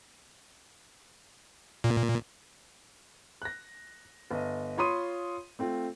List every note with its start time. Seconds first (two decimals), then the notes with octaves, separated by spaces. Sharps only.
1.84 A#2
3.42 F#6 A#6
4.31 G1 D#5
4.78 F4 C#5 B5 C6 D#6 D#7
5.59 A3 C4 F4